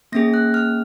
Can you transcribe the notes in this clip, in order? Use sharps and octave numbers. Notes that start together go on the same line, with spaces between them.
A#3 C#4 G#4 A#6
F#6
F6